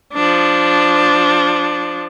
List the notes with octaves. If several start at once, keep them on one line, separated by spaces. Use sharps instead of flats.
F3 D4